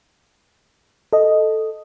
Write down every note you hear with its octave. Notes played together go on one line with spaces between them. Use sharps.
A4 D#5